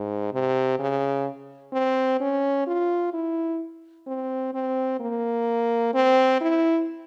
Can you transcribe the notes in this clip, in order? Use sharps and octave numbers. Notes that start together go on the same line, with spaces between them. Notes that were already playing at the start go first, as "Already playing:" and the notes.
Already playing: G#2
C3
C#3
C4
C#4
F4
E4
C4
C4
A#3
C4
E4